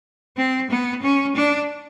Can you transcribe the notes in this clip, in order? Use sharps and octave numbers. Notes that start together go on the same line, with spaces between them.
C4
B3
C#4
D4